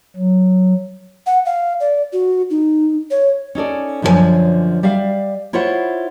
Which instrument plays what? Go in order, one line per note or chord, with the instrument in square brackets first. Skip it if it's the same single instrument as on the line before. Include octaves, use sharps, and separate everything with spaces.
[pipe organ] F#3
[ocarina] F#5
F5
D5
F#4
D#4
C#5
[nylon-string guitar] C#4 D#4 A4 D5
F#2 D3 F3 A4 C#5 G#5
G3 D5 E5 F5
E4 F4 C5 C#5 E5 F#5